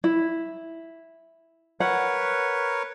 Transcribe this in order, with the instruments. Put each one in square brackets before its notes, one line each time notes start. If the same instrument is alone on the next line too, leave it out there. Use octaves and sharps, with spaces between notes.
[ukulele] E4
[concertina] A#4 B4 C#5 [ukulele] F#5